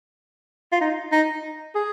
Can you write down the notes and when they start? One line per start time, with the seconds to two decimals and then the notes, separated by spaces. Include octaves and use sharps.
0.72 F4
0.81 D#4
1.12 D#4
1.75 G#4